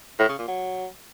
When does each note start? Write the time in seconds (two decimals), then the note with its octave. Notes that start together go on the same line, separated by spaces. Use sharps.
0.19 A2
0.29 C#3
0.39 A#2
0.48 F#3